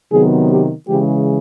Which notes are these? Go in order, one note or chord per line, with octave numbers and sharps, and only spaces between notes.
C3 D#3 F#3 B3 G#4
G4
C#3 E3 G#3 G4